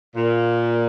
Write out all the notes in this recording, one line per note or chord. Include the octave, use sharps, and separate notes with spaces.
A#2